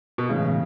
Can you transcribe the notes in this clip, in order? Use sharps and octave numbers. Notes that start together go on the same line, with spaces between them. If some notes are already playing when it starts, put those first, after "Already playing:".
B2
A2 C#3 E3 G#3